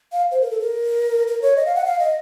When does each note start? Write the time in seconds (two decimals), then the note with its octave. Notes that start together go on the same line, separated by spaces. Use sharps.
0.12 F5
0.32 C5
0.41 A#4
0.51 A4
0.60 A#4
1.28 A#4
1.42 C#5
1.56 D#5
1.66 F5
1.75 F#5
1.85 F5
1.99 D#5